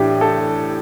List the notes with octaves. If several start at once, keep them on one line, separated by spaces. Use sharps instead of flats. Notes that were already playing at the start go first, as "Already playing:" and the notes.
Already playing: A2 E3 D4 G4
A4